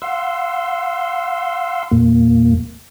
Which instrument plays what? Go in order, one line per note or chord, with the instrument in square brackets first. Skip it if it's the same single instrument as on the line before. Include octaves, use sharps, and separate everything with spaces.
[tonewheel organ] F5 F#5 C6 E6
E2 A#2 A#3